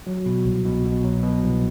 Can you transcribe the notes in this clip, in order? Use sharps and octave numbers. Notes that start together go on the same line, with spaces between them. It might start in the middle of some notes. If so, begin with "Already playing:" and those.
F#3
B2
C2
B2
B2
F#3
B2
C2